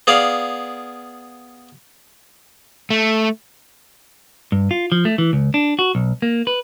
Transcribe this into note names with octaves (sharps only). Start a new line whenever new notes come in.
B3 G#4 D5 F5
A3
G2
F4
F3
A3
E3
C#2
D4
F#4
B1
A#3
B4